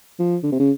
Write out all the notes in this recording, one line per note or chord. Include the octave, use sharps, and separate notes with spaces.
F3
D3
C3
C#3